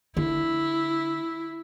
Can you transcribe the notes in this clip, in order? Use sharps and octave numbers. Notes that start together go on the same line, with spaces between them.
D3 E4